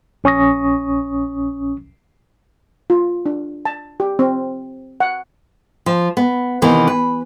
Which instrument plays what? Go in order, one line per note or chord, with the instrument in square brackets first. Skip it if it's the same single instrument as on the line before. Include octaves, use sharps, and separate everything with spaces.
[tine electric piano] A#1 C#4 C#6 D#6 A#6
[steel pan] F4
D4
A5
G4
C4
F#5
[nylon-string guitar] F3
B3
C3 D#3 E3 B3
B4